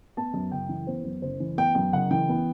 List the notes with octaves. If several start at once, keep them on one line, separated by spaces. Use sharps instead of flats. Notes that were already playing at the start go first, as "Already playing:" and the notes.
B3 A5
F#2
F#1 G5
E3
B3 C5
F#2
F#1 C5
E3
B3 G5
F#2 G5
F#1 F#5
E3 G5
B3